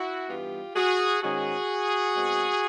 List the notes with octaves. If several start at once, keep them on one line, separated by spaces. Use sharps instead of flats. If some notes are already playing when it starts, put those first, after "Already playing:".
Already playing: E4 F#4
G2 E3 G3 B3 F4 G4
F#4 G#4
G#2 D#3 G#3 C#4 F#4 G#4
B2 G#3 C4